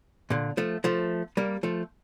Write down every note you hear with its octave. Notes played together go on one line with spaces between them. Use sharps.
A#2 D3
F3 A3
F3 A3
G3 A#3
F3 A3